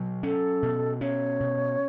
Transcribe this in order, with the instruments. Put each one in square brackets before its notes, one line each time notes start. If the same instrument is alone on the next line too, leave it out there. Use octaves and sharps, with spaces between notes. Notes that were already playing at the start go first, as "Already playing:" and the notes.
Already playing: [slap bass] B2 F#3
[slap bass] C#4 [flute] A4
[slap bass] B2
[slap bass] C#4 [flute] C#5
[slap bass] B2